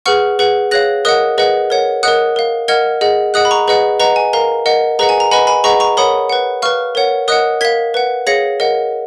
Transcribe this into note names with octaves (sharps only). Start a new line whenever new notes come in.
G#4 B4 F#5 C#6 F6
G#4 B4 F#5
G#4 C#5 F5 F#6 A#6
A#4 D#5 F#5 D#6 F#6
G#4 B4 D#5 F#5
A#4 C#5 F#5
A#4 D#5 F#5 D#6 F#6
A#4 F5
A#4 D#5 F#5 F6 G#6
G#4 D#5 F#5
G#4 D#5 F#5 D#6 F#6
B5
A#5 C#6
G#4 B4 D#5 F#5
B4 D#5 F#5 A#5
G#5
A#4 F5 A#5
A#4 D#5 F#5
G#4 B4 D#5 F#5 A#5
G#5
A#5
B4 D#5 F#5 G#5 B5
G#5 B5
G#4 B4 D#5 F#5 A#5 C#6
A#5 C#6
A#4 C#5 F#5 B5 D#6
B4 F#5
B4 F5 C#6 F6
A#4 C#5 F#5
A#4 D#5 F#5 D#6 F#6
A#4 F5 G#6 B6
B4 F#5
G#4 C#5 F5 A#6 C#7
A#4 D#5 F#5